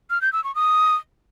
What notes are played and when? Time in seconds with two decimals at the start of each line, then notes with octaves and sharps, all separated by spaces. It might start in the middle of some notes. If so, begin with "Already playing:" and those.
0.10 F6
0.21 G6
0.33 E6
0.44 C#6
0.55 D#6